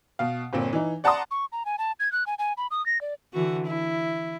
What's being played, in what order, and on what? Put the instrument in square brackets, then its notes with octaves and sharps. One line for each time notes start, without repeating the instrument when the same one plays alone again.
[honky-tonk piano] B2 F5
G1 A#2 C4
E3 D#4
D5 F#5 A5 A#5 C6 D#6
[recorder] C#6
A#5
G#5
A5
G#6
F#6
G#5
G#5
B5
D#6
A#6
D5
[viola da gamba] D3 E3 F#4
E4